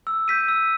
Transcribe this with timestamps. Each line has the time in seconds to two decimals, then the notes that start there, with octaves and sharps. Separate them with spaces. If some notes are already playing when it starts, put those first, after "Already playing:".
0.07 E6
0.28 G6 B6 D#7
0.48 E6